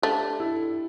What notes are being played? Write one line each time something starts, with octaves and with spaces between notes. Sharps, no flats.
A3 D4 G4
E4 A4